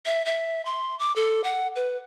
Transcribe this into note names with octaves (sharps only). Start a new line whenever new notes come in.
E5
E5
C6
D6
A4
F#5
B4